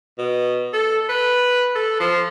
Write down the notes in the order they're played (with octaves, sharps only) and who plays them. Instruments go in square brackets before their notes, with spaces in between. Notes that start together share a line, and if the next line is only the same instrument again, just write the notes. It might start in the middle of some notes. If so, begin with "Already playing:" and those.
[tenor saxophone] B2
A4
B4
A4
F3